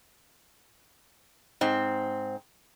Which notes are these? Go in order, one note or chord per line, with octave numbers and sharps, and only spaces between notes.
G#2 C4